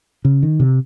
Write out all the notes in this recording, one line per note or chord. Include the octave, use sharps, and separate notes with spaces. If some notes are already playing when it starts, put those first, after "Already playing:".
C#3
D#3
C3